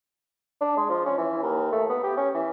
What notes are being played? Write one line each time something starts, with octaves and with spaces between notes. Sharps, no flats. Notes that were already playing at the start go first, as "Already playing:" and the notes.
D4
G#3
F3
C#4
E3
D#2
A3
B3
G4
C#4
E3